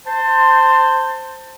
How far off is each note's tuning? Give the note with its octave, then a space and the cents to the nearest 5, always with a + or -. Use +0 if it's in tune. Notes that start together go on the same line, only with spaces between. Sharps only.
C5 +0 A5 +25